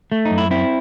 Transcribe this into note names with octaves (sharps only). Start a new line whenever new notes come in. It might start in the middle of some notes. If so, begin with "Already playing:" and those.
A3
D#4
F#2
E4
C4 E4